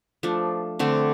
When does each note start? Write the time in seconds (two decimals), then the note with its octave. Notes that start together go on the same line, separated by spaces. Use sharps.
0.23 F3 A3 D4
0.79 D3 A3 C4